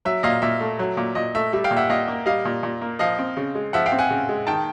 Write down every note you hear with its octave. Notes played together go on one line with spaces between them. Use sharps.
F#3 E5
A#2 D#5 F5
A#2 E5
A3
F#3
A#2
A#2 D#5
A3 E5
G3 E5
F5 G5
A#2
E5 F#5
A#2 D#5 F5
A#3
G3 D#5 F5
A#2
A#2
A#3
F3 D#5 F5
C4
C#3
G#3
F3 E5 F#5
F5 G5
C4
F#5 G#5
C#3
G#3
D#3 G5 A5